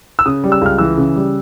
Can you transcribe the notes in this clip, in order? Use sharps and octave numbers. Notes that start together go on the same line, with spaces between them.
E6
C#3 D#6
G3
E6
C#2 F6
E3 E6
C#3
G3